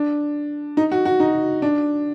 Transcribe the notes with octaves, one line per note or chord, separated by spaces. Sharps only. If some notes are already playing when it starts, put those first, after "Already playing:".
Already playing: D4
D#4
F#4
F#4
D#4
D4